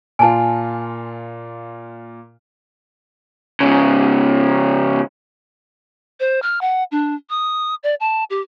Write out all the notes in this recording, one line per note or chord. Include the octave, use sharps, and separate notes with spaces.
A#2 F4 G#5 A5
G#2 C#3
C5
F6
F#5
D4
D#6
D5
A5
G4